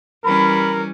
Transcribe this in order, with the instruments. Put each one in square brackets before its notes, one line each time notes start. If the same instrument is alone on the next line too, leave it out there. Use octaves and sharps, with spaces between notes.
[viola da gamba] E3 G3 C#4 [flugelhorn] A#4 [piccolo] B5